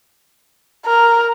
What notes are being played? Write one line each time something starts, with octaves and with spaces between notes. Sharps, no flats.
A#4